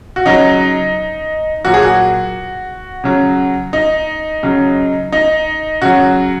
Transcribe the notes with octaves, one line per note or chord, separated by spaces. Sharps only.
F#4
C#3 F#3 D#4
A#2 F#3 F#4
G#4
F#4
C#3 F#3
D#4
C#3 F#3
D#4
C#3 F#3 F#4